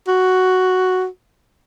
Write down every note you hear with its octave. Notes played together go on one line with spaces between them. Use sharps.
F#4